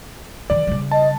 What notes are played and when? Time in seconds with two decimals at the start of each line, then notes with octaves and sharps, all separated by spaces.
0.50 D#3 E3 D5
0.67 C#3 G3
0.91 D#5 A5